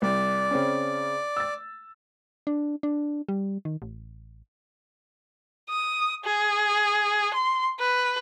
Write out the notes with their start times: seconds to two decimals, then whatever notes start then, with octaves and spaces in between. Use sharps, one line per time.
0.02 C2 D5
0.51 C#3 C4 C#4
1.37 E6 A6
2.47 D4
2.83 D4
3.29 G3
3.65 D#3
3.82 A1
5.69 D#6
6.24 G#4
7.34 C6
7.79 B4